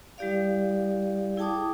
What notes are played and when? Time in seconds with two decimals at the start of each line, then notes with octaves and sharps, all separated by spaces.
0.18 G3 E4 G4 D5 F5
1.37 E4 G#4 G5 A5 D6 D#6